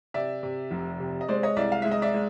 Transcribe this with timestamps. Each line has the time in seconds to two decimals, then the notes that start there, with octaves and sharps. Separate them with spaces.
0.14 C3 D5 E5
0.43 C3
0.71 F1
1.00 C3
1.21 D#5
1.28 G#3 C5 D5
1.43 C#5 D#5
1.56 C2 D5 E5
1.72 F5
1.82 G#3 E5
1.91 D#5
2.02 D5 E5
2.14 G#3